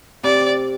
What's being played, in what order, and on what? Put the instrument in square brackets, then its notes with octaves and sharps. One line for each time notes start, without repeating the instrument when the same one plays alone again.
[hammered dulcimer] C3 [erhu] D5